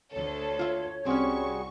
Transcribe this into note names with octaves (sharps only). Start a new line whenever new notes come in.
D2 A4 C#5
F4 E5
C2 G3 C4 C#4 F#4 G#4 C#6